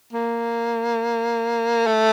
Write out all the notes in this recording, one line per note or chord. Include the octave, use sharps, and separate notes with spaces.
A#3
A3